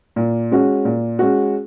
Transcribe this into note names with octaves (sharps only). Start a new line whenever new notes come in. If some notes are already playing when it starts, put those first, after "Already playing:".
A#2
G#3 C#4 F#4
A#2
G#3 C#4 F#4